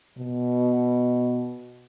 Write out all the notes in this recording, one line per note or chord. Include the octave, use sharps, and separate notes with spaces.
B2